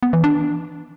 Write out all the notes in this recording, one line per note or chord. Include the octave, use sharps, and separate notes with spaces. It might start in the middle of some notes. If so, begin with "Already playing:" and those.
B3
E3
D4